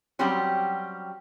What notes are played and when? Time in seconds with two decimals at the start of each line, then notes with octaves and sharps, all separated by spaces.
0.19 F#3 G3 C4 C#4 F#4 G4